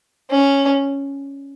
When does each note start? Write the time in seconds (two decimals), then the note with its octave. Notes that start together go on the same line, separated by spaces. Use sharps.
0.30 C#4